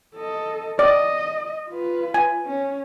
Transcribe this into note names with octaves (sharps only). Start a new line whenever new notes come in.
A4 D#5
D5 D#5
F4 B4
G#5
C#4